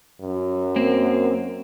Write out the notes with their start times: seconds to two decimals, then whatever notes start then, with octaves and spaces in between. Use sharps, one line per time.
0.21 F#2
0.76 A#3 C4